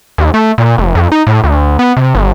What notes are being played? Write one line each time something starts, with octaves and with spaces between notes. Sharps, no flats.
D#2
A3
A#2
F1
F2
D#4
A2
D2
B3
C3
G1